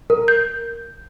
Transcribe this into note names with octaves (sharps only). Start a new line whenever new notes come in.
A#4
G6